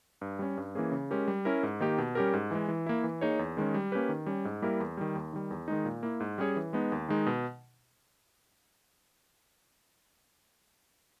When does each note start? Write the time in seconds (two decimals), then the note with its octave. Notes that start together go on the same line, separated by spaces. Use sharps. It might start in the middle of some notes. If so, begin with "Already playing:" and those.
0.21 G2
0.39 G3 C#4
0.57 G2
0.75 E3 A#3 C#4 G#4
0.92 C#3
1.10 G#3 C#4 G4 A#4
1.28 G3
1.45 C#4 E4 A#4
1.63 G#2
1.80 D#3 A#3 D#4 G4
1.98 B2
2.15 G3 C#4 G4 A#4
2.33 G#2
2.51 E3 G#3
2.68 E3
2.86 A#3 E4
3.04 E3
3.21 A#3 D#4 G#4 C#5
3.39 E2
3.57 D#3 G#3 C#4
3.74 G3
3.92 A#3 C#4 G4 B4
4.09 D#3
4.26 G3 C#4
4.45 G#2
4.62 G3 A#3 E4 A#4
4.80 E2
4.97 D#3 G3
5.15 D#2
5.33 D#3 G3
5.51 E2
5.68 D#3 G#3 D#4
5.85 A#2
6.03 A#3 E4
6.20 G#2
6.38 G3 C#4 G#4 C#5
6.56 E3
6.73 G#3 B3 D#4
6.92 D#2
7.08 D#3 G#3 D#4
7.26 B2